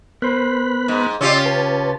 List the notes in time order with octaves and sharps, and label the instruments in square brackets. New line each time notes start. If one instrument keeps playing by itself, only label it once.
[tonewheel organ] B3 B5 F#6 [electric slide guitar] A#4 C5
[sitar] G#2
[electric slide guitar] C#3 [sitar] C#4 F4 G4 [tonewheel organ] D5 D#5 E6
[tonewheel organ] B4 A5